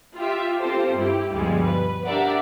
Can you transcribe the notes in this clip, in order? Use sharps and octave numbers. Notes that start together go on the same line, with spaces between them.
F4 G4 E5
C4 F4 G4 A4 C5
G2 E4 G4
D2 G2 B2 F3 G3 G#3
B4
D4 G4 A#4 D5 E5 F#5